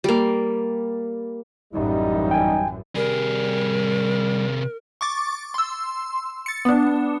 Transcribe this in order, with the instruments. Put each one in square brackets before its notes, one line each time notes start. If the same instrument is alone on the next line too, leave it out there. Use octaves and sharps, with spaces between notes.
[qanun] G3 A#3
[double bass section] A1 F#2 E3 [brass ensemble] G3 D#4
[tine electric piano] G5 G#5
[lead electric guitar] C3 G#4 [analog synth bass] G3 [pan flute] A#4
[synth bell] C#6 D6 A6
C6 E6
A6 C#7
B3 D4